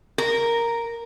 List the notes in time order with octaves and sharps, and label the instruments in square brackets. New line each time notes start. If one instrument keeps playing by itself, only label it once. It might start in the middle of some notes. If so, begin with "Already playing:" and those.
[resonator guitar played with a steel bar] A#4